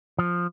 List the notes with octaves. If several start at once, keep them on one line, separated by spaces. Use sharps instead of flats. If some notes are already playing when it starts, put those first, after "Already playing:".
F3